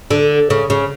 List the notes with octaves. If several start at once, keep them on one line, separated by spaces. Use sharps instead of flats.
D3
C#3
C#3